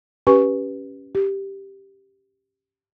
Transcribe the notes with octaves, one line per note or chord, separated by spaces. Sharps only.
C#4 G4 B4 G#5 C#6
G4